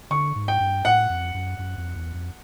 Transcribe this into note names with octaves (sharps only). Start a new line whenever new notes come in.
D3 C#6
G#2
G5
G2
A2 F#5
F2
F#2
F#2
F2
E2
F2